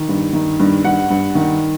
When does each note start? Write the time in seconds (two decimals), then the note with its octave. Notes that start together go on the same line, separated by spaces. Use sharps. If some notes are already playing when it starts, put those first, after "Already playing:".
Already playing: D#3
0.09 G2
0.33 D#3
0.60 G2
0.84 G2 F#5
1.10 G2
1.35 D#3